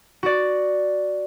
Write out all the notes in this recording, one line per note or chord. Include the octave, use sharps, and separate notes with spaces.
F#4 D5